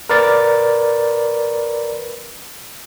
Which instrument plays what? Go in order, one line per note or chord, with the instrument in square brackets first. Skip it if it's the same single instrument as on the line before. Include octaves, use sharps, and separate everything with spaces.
[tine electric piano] A#4 B4 D5 A6